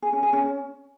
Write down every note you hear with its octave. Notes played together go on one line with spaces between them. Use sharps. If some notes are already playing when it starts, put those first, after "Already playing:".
G#4
C#4
G#4
C#4